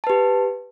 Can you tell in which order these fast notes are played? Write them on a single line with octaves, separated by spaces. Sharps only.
A5 B4 G4